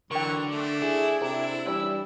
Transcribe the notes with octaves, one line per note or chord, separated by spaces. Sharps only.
D3 E3 F#3 A#4 G5 C#6
A3 D4
E4 G#4 A5
C3 D4 A4 A#5
E3 G3 D4 D5 E6